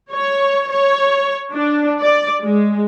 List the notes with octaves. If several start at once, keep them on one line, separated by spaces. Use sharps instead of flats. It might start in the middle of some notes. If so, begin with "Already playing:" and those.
C#5
C#5
D4
D5
G#3